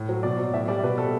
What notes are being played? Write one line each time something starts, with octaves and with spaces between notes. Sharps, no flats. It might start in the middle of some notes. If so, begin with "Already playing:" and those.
Already playing: A2
F#3
B2 D5
F#3
A2 E5
G3 D5
B2 B4
G3 A4